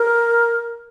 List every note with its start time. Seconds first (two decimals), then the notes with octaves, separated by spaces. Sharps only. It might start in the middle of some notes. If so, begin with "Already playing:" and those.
Already playing: A#4